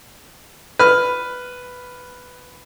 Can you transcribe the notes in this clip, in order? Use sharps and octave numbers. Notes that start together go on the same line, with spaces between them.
B4 F6